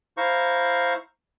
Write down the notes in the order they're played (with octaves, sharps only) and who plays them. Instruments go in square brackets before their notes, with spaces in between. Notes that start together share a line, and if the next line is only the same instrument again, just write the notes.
[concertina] E4 C5 F5 A#5 C#6